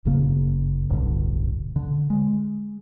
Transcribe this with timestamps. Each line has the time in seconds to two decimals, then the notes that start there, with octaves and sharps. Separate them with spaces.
0.05 G1 F#2 C#3 A#3
0.90 D1 B1 G2 D3
1.76 D3
2.10 G#3